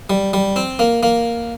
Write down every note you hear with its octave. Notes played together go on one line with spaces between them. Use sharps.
G3
G3
C4
A#3
A#3